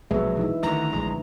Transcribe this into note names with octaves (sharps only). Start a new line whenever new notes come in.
A#1 B2 F#3 G#3 B4 E5
E3 D#4 E4
D2 D3 D#3 G3 A#5
A#1 G#3